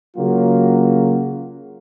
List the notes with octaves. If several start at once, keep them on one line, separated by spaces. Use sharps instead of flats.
C#3 F#3 A#3 F4 F#4